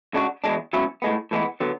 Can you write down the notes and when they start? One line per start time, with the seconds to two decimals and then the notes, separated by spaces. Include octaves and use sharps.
0.14 C#3 G#3 D4 F#4
0.44 E2 B2 G#3 D4
0.73 C#2 B2 F#3 C#4 E4
1.02 A2 G#3 B3
1.31 A2 E3 G#3 B3
1.60 D3 F#3 B3